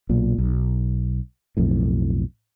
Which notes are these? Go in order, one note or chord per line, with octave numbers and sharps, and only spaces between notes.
B1 A#2
B1
B1 F2 A2